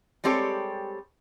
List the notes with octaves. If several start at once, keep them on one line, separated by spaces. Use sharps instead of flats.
G3 G#3 C4 G4 A4 C#5